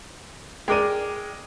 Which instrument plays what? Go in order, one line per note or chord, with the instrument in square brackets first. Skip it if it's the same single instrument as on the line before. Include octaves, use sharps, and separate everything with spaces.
[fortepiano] G#3 A#4 D5 [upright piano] G5 D6 D#7